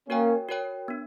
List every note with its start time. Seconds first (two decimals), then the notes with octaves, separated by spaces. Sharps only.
0.09 A#3 C#4 F#4 A#4 C#5 G5
0.49 F#4 A#4 C#5 G5
0.88 B3 D4